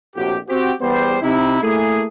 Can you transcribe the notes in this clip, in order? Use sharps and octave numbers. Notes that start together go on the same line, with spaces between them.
A#1 F2 A2 C3 F#4 G4
C4 F#4 G4
E2 G3 B3 C5
C3 D#4 E4
A3 A#3 E4 G#4